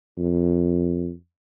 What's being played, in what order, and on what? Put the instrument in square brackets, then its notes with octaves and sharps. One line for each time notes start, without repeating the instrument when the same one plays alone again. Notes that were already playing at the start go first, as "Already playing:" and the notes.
[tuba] F2